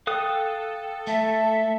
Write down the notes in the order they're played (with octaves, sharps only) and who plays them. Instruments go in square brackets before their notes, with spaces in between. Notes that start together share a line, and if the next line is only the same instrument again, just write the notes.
[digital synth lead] A4 [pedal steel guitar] F5 D#6 F#6 [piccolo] G5
[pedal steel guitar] A3 [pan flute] E5 [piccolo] A5